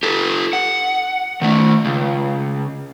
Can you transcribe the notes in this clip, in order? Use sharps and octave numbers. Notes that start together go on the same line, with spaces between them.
G4 A4
F#5
D#3 A3
C#2